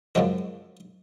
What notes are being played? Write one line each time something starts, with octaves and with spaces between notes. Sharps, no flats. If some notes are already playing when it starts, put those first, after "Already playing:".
F#2 C#3 F3 G#3 F#4